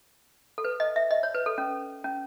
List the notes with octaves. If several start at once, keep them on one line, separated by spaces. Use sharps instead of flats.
A4
B4
D#5
E5
D#5
C#5
B4
A4
C#4
C#4